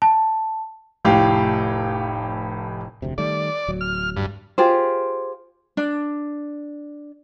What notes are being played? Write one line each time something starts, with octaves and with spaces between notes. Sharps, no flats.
A5
F1 A2 G4 F5
F1 D2 C3
D#3 G3 A3 D5
D1 F#3
F6
G2
F4 G4 G#4 C5
D4